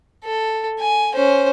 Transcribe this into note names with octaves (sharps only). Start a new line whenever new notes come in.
A4
G#5
C#4 C5